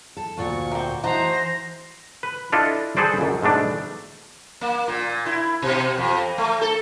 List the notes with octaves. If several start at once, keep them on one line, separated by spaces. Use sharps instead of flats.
A4
D2 A#2 F#4 C#6
A#3 C4
E3 A3 D#4 F#4 C5 A#5
A#6
B4
D4 E4 F4 A4 D#5
G#4 A4 B4 C5 D5
C#2 F#2
G#2 B2 A3 D4
A#3
A#2
E4
B2
F2
A3
A4